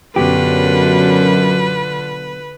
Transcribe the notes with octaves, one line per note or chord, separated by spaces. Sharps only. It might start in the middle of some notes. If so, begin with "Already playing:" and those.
F#2 B2 D3 F#3 F4 G4 B4